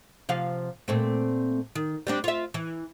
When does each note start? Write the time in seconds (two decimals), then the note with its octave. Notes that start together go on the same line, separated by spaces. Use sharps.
0.29 C3 F3 F5
0.88 A#2 A3 C4
1.75 D#3
2.07 G3 C4 D4
2.24 F4 E5
2.54 E3